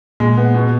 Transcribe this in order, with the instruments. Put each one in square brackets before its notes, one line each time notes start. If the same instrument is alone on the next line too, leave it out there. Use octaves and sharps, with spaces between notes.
[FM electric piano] A#2 [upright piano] G#3
[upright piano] B3
B2